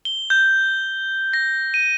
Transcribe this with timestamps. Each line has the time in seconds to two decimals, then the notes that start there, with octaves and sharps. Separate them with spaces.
0.05 G7
0.30 G6
1.33 A#6
1.74 D#7